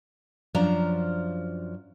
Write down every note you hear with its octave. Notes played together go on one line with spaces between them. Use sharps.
F#2 F3 D4 F5 A#5